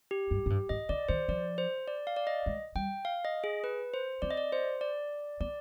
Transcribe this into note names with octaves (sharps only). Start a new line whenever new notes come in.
G4
G2
G#2
G2
G#2 D#5
D3 D5
D#3 C5
F3 D5
C5
D5
F5
D5
D#5
G#3
G3 G5
F5
D#5
G#4
B4
C5
C4 D5
D#5
D5
C5
D5
B3 D5